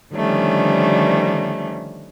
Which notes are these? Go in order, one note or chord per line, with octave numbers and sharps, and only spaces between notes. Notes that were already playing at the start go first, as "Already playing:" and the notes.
D3 D#3 F3 G3 A3 C#4